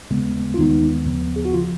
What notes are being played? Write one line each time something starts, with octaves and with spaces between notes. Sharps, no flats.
D#2 C#3 G#3 B3
F4
D#2 D#3 G#3 B3 D#4
D#2 C#3 F3 B3
G#4
F#4
C#3 F3 F4